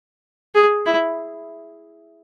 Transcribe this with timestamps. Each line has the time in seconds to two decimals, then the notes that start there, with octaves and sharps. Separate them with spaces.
0.55 G#4
0.86 E4